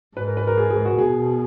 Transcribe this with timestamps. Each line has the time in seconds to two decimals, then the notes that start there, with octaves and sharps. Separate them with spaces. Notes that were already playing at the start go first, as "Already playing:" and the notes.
0.16 G#2 B4
0.27 A#4
0.37 B4
0.47 A#4
0.58 G#4
0.70 G#4
0.85 F#4
0.98 B2 G#4